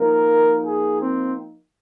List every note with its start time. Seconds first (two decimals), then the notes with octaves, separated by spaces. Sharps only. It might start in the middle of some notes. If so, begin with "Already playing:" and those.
Already playing: F3 A#3 D#4 A#4
0.66 G#4
1.01 C4